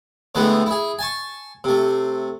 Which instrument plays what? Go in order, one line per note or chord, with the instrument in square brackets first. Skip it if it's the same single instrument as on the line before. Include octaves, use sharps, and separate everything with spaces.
[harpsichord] A2 D3 E3 G#3 A3 B3
E4 G#4
G#5 A5 C#6
C3 A3